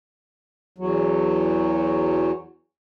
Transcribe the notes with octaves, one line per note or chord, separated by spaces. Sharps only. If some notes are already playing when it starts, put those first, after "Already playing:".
E2 F#3